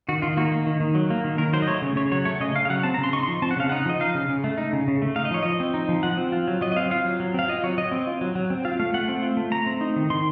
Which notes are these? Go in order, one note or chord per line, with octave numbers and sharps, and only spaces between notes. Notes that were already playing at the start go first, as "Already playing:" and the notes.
D#3 F#4
D#3 F4
A#3 F#4
A#3
D#3
D#3
F#3
A#3
D#3
D#3 A#4
F#3 C5
D#5
A3 C#5
C#3
C#3 C#5
F#3 C#5
A3 C#5
C#3 D#5
C#3 F5
F5
F#3 F#5
C4 A5
A#5
C#3
C6
D#4 C#6
C6
F3
C4 A5
F#5
C#3 F5
D#4 F#5
F3 D#5
D#4 F5
C#3
C#3
A3
D#4
C#3
C#3
A3
D#4 F5
D#5
F3 C#5
F3 D#5
C4
D#4
F3
F3 F#5
C4
F4
F#3
F#3 D#5
D#5
C4 F5
F4 F5
F#3
F#3
C4 F5
F4 D#5
F#3 C#5
F#3 D#5
C4
F4
F#3
F#3
C4
F4 F5
A3 F5
A3 F#5
C4
F4
A3
A3 A#5
C4
D#4
D#3
D#3 C6